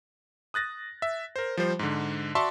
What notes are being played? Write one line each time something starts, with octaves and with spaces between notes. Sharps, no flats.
D#6 F#6 A6 A#6
E5
A#4 C5
F3 G3 C5
G#2 D3
F#4 D5 E5 A5 C6 C#6